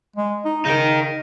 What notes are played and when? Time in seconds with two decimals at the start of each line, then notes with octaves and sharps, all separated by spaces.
0.16 G#3
0.45 D#4
0.65 C#3 D#4 A#4